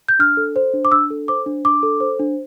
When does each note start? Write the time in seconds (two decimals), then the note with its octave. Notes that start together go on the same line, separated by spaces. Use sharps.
0.08 G6
0.19 D4 F6
0.37 A4
0.56 C5
0.74 D4
0.85 D6
0.92 D4 E6
1.10 A4
1.28 C5 D6
1.46 D4
1.65 D4 D6
1.83 A4
2.00 C5
2.19 D4